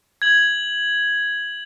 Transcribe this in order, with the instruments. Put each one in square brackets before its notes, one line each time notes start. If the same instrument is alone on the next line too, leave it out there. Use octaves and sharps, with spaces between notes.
[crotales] G#6 F#7